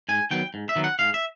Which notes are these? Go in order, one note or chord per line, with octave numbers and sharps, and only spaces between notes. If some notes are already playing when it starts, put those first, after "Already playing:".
G#2 G#5
D#3 F#3 B3 G5
G#2
E5
D#3 F#3 B3
F#5
G#2 F5
E5